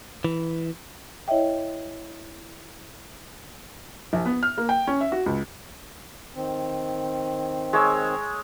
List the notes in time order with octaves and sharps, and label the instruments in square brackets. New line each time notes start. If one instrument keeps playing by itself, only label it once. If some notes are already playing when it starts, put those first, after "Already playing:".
[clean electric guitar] E3
[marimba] E4 C#5 D#5 E5 G5
[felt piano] A#1
B3
F6
A#3
G5
C#4
E5
F#4
C#2
[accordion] D#3 C4
[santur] G#3 C#5 E6